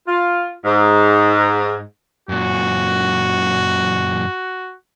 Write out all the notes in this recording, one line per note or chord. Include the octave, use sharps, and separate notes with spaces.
F4
G#2
F#2 A#2 F#4